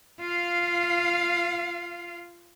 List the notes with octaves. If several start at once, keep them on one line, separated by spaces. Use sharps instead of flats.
F4 F5